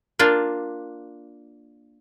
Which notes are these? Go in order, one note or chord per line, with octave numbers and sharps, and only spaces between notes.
A#3 D4 F4